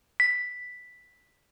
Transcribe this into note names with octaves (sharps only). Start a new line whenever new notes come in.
B6